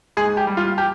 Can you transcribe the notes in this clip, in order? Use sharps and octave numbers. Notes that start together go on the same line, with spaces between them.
G#2 G#4
G4
G3
F4
G4